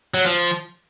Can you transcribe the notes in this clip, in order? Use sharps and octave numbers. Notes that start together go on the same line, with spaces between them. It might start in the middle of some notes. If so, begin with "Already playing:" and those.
F#3
F3